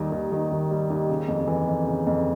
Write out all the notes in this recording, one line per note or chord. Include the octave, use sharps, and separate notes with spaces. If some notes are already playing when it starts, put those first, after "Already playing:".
Already playing: D#2 D#3 G3
D#2
D#3
D#2
G3
D#2
C#3
F2
E3
F2
C#3
F2